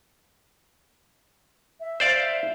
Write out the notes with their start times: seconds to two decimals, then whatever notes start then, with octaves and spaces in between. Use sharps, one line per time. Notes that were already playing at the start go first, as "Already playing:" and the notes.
1.80 E5
2.00 C5 D5 F5